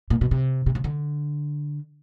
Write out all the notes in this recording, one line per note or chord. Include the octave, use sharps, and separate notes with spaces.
A#2
B2
C3
C3
C#3
D3